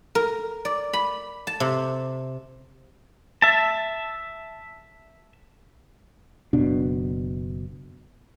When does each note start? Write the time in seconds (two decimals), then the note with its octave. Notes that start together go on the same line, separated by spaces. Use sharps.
0.15 A#4
0.65 D5
0.93 B5
1.47 A5
1.60 C3
3.42 E5 A5
6.53 F#1 B2 D4